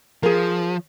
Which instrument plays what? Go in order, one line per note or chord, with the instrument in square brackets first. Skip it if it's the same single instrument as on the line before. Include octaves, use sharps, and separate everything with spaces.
[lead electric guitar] F3 [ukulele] G#4 A#4